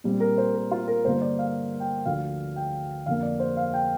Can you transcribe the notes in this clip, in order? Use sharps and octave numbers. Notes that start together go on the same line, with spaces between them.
A#2 G3 C4
A#4
C5
A#4
F4
A#4
G2 D3 A#3 C5
D5
F5
G5
D2 D3 F3 F5
G5
F2 D3 A#3 F5
D5
C5
F5
G5